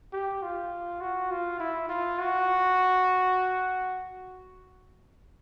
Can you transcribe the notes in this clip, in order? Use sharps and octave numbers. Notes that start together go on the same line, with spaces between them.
G4
F4
F#4
F4
E4
F4
F#4